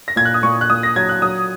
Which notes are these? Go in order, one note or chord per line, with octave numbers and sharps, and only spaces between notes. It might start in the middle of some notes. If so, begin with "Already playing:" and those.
A#6
A#2 G#6
F#6
D#6
A#2 C#6
F#6
A#2 D#6
A#6
F#3 G#6
F#6
F#3 D#6